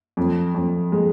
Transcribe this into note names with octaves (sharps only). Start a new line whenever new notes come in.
F2
F2
G#3